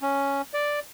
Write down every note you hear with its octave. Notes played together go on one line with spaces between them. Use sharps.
C#4
D5